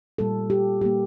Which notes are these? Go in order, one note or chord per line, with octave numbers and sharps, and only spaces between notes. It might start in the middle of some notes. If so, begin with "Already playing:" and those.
A#2 G3 A#3 A4
G4
A#2 G3 A#3 G4